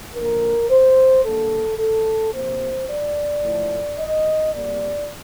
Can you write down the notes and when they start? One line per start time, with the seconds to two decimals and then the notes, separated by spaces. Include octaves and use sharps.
0.15 D3 F3 A#3 A#4
0.70 C5
1.24 D3 G3 A#3 A4
1.79 A4
2.34 C3 F3 A#3 C5
2.89 D5
3.43 A2 F3 A3
3.97 D#5
4.52 C3 G3 A#3 D5